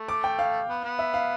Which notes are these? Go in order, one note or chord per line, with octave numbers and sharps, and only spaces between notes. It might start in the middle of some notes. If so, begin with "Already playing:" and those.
Already playing: A3
D6
G5
F5
B3
B3
E5
F5